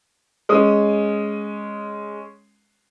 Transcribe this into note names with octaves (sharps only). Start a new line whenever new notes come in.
G#3 C#4 D#6